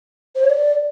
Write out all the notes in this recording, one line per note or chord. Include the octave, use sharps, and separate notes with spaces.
C5
C#5
D5